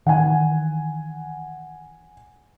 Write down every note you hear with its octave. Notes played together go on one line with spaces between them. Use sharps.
D#3 E3 F#5 G#5